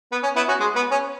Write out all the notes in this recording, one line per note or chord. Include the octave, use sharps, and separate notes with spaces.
B3
C#4
B3 E4
C#4 F#4
G#3
B3
C#4